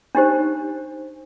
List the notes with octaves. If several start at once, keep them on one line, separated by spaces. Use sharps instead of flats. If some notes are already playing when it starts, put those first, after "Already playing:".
D4 D#4 G4 C5